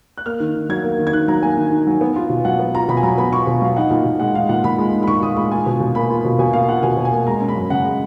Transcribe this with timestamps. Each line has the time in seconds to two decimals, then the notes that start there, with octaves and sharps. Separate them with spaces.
0.18 F#6
0.26 A#3 F6
0.40 D#3
0.55 D#3
0.69 F#3 G#6
0.84 A#3
0.98 D#3
1.07 G#6
1.13 D#3 F#6
1.28 F#3 A#5
1.43 A#3 G#5
1.57 D#3
1.72 D#3
1.87 F#3
2.01 B3
2.16 F4
2.30 B2
2.45 F#3 F#5
2.59 B3
2.74 F4 A#5
2.88 B2 B5
2.97 G#5
3.03 F#3 A#5
3.18 B3 B5
3.32 F4 C#6
3.47 B2
3.62 F#3 F5
3.76 D#4 F#5
3.91 A#2
4.05 A#2
4.20 G#3 F#5
4.35 D#4 F5
4.49 A#2 F#5
4.64 A#2 B5
4.78 G#3
4.93 D#4
5.03 B5
5.08 A#2 C#6
5.22 A#2 D#6
5.36 G#3 B5
5.51 F4 G#5
5.66 B2
5.80 B2
5.95 A#3 B5
6.10 F4
6.25 B2
6.39 B2 G#5
6.53 A#3 F5
6.68 F4 F#5
6.83 B2 G#5
6.97 B2
7.05 G#5
7.12 A#3
7.27 G#3 A#5
7.41 C#4
7.48 B5
7.56 F#2
7.70 C#3 F#5
7.85 G#3